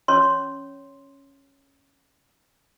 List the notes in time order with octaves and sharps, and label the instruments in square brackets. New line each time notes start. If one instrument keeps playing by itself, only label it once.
[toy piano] C#4 C#5 C6